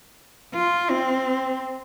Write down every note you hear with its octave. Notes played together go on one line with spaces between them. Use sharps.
F4
C4